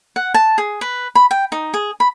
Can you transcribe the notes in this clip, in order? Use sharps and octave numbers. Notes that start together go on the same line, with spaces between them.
F#5
A5
G#4
B4
B5
G5
D#4
G#4
B5